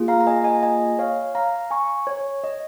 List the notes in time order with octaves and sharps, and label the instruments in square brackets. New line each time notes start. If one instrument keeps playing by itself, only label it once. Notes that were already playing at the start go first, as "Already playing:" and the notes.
Already playing: [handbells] A#3 F4 G#4
F5 A#5
A#5
D#5 G#5
D#5 G#5
D#5 G#5
C#5 F5
F5 A#5
G#5 C#6
C#5
D#5